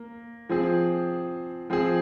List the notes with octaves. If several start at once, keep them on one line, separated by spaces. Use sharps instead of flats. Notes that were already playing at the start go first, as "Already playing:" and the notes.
Already playing: A#3
F3 C4 G#4
F3 C4 G#4